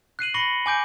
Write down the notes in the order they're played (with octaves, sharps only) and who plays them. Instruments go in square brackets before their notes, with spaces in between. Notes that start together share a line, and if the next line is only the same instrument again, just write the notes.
[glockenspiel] F#6 C7 D#7 F#7
B5 C#6 A#6 C#7 F#7 G7
G#5 D6 G6 D7